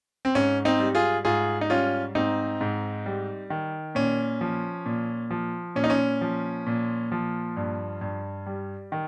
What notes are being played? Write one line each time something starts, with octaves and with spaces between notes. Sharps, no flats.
C4
G#2 C#4
C4 D#4
G3
F4 G#4
G#2 F4 G#4
D#4
G3 C#4 F4
G#2 C4 D#4
G#2
G3
D#3
A#2 C#4
F3
A#2
F3
A#2 C#4
D#4
C#4
F3
A#2
F3
G2
G2
G3
D#3